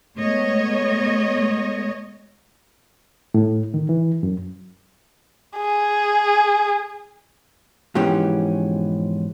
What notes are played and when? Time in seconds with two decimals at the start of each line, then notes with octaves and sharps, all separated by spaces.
0.16 G#3 A3 B3 C#5 D#5
3.34 A2
3.74 D#3
3.89 E3
4.23 F#2
5.58 G#4
7.95 G#2 B2 E3 F3 C#4 G4